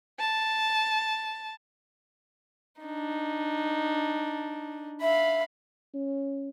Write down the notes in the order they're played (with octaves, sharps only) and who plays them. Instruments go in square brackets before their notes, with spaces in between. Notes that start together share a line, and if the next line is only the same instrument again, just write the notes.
[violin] A5
[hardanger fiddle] D4 D#4
[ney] E5 [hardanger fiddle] F5 B5
[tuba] C#4